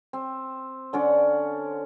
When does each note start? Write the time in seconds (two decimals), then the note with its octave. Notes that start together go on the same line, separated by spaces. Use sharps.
0.13 C4
0.93 D3 C#4 D5 F#5